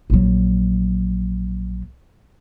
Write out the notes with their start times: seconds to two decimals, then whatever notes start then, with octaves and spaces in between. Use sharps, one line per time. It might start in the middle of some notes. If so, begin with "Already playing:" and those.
0.10 A#1 F#3